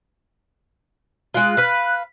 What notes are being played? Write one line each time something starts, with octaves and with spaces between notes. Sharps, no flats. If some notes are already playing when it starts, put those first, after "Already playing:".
G#3 F4 F#6
B4 F5